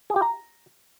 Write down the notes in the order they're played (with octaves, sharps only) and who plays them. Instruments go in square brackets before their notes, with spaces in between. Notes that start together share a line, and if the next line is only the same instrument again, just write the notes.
[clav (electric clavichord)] G#4
G4
A#5